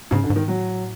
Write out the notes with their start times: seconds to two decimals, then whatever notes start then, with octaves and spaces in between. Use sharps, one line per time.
0.11 G#2 C#3
0.24 D3
0.30 G#2
0.36 D#3
0.48 A2 F#3